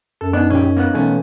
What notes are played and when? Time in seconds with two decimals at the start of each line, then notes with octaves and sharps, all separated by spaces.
0.21 F#2 A4
0.33 B3 D4 D#4 D#5
0.50 A#1 C#4 G4
0.77 A#3 B3 F#5
0.95 B1 E3 A3 C#4